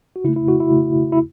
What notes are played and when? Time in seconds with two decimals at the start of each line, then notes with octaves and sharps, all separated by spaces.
0.16 F#4
0.24 C#3 E4
0.28 A3
0.36 E4
0.48 F#4
0.60 E4
0.72 C#3 A3
1.12 E4